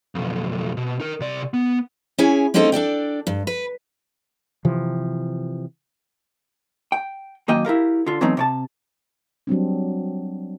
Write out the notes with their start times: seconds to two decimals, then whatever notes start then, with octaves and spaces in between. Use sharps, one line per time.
0.15 B1 F2
0.77 B2
1.00 D#4 A#4
1.20 C3 D5
1.54 B3
2.18 C#4 E4 G#4 C#5 G#5
2.54 A#3 C4 C#4 D#4 A4 C5
2.72 D4 A4 D5 G5
3.27 G2
3.47 B4
4.65 C3 E3 F3
6.92 G5
7.48 F#2 D#3 A#3 D#5 G5
7.65 E4 G4 A#4 F5
8.06 D3 F4
8.21 E3 F#3 A3 B3 C4 D#4
8.37 C3 C#5 A5
9.47 F#3 G3 C4 D4